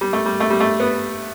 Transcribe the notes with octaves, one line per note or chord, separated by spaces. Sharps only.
G3
A3
G3
A3
G3
A3
B3